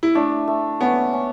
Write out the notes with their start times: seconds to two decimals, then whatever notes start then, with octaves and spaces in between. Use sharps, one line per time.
0.03 E4
0.15 A3 D4
0.48 A3
0.81 B3 C#4
1.13 C#4